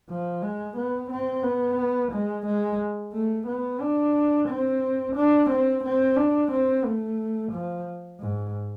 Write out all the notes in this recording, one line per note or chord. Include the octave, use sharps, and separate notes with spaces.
F3
G#3
B3
C4
B3
G#3
G#3
A3
B3
D4
C4
D4
C4
C4
D4
C4
A3
F3
G#2